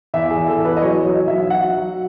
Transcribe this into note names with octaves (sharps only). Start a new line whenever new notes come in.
E2 E5
G#4
E2
A4
E2
B4
D#5
F#3 C#5
F#3 D#5
B1 E5
F#3 F#5
F#3